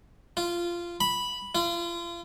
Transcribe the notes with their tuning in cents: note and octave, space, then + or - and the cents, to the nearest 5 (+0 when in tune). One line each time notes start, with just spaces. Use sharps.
F4 -15
B5 -5
F4 -35